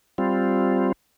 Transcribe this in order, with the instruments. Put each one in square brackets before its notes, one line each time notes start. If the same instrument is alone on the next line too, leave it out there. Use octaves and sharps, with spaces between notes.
[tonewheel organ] G3 C4 F4